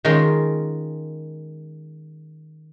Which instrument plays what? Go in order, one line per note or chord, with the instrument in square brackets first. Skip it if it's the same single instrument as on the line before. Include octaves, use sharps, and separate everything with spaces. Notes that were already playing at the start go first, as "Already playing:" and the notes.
[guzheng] D#3 G#3 C#4 F4 A#4